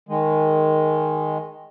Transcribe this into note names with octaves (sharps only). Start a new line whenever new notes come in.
D#3 G#3